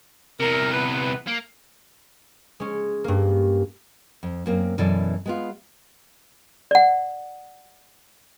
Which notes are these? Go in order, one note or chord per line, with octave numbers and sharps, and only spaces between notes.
E2 C3 A#4
B3 B4
A#3
G#3 C#4
G2 A#3
F2
F#2 A#3 C4
F#2 B2 E3 A4 D5
G#3 B3 F4
D5 F#5